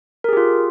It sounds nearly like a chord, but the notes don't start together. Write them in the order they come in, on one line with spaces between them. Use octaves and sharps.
A#4 G#4 G4 F4